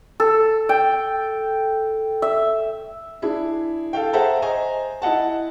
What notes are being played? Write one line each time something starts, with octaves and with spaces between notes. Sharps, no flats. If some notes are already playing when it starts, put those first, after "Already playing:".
A4
G5
E5
D4 E4 G#4
A4 F5 G5
G#4 C5 E5 F#5 A5 A#5
C5 D#5 G#5 A#5
E4 D#5 F#5 A5